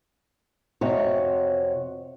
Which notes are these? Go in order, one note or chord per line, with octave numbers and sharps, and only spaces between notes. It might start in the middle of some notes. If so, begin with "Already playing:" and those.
F2 C3 F#4 C#5